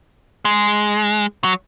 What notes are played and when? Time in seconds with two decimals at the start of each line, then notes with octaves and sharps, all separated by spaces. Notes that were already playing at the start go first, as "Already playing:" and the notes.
0.45 G#3
1.44 F#3